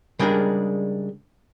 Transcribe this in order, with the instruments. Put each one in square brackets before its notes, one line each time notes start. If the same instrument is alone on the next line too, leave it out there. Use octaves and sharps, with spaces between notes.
[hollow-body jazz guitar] C#3 G3 G#3 D4 G#4 A#4